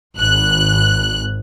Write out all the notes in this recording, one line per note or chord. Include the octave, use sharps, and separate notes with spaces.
G#1 F#6